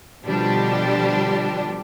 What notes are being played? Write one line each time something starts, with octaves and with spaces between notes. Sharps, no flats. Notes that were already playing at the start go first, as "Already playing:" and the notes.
B2 D3 F3 G3 D4 G4